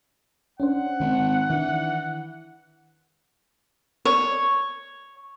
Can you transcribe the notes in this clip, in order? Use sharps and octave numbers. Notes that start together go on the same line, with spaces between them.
C#4 D4 C5 F#5
G#1 D#3
D#3 E3 D4
C#5